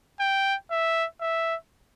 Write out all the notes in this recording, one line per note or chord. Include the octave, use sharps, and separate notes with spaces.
G5
E5
E5